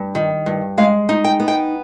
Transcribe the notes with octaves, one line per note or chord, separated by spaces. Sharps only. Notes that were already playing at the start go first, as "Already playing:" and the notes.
Already playing: G2
D#3
G2
G#3 F5
D#4
G5
B3
G5